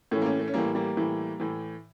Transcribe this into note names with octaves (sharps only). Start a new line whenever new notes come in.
A2 E3 A3 C#4
A#3
A3 C#4
A3
C#4
A2 E3 G3 A#3
G3 A#3
A2 E3
A2 E3